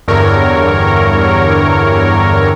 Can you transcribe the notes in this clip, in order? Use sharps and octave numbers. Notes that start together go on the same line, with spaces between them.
E2 G2 D3 A#4 C#5